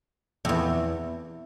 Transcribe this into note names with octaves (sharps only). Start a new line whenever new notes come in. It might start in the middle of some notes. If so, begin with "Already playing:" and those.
F2
E2